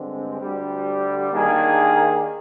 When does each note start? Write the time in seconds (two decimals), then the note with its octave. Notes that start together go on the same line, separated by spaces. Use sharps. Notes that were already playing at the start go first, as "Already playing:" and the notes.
Already playing: G2 D3 G#3 C4
0.40 D2 D3 G3
1.30 D#2 D#3 A#3 D4 G#4